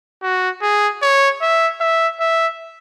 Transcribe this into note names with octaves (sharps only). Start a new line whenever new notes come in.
F#4
G#4
C#5
E5
E5
E5